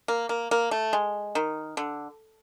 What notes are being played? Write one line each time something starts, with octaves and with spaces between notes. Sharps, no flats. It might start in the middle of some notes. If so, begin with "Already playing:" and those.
A#3
A#3
A#3
A3
G#3
D#3
D3